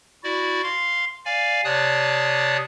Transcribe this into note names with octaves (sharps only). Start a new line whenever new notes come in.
E4 F#4 D5
F5 C6
D5 F5 G#5
C3 C#5 D5 A5 D#6 F#6